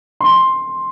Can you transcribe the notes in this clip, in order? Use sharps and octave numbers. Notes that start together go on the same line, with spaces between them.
C6